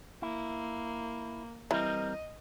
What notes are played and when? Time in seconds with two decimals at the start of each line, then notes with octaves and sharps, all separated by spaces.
0.22 A#3 E4
1.71 E3 G3 C4 A#4 D#5